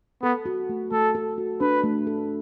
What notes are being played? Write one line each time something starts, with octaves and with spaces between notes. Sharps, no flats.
B3 A4
F#4
A3
A3 A4
A4
F#4
D4 B4
A3
A4